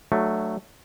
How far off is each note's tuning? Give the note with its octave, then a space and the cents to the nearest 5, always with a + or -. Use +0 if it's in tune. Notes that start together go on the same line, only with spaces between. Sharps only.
F#3 +0 A3 +0 D4 +30